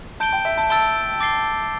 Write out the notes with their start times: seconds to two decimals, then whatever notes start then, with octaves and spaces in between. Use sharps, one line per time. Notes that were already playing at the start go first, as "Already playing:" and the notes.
0.20 A5 G6 D7 G7
0.33 G5
0.45 E5
0.57 A5
0.70 A5 E6 A6 D7 G7
1.20 D6 A6 C7 G7